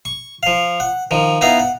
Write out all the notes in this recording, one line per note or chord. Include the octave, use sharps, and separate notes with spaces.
C#6
F3 F5
F#5
D#3 F3
B3 D#4 E4 F5 F#5
F#5